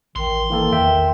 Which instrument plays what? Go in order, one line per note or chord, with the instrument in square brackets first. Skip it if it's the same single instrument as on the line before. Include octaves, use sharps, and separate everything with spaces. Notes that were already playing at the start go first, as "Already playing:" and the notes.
[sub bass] A1 [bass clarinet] D#3 [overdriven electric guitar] C6
[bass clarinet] D#3 [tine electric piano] E3 A#3 A4
[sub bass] E2 [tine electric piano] E5 G5